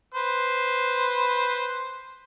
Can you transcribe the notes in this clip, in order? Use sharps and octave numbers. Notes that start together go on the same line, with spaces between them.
B4 C5